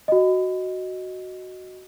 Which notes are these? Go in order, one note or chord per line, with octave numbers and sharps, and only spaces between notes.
F#4 D#5